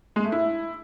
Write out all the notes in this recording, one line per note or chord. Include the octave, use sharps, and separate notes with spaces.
G#3
A3
E4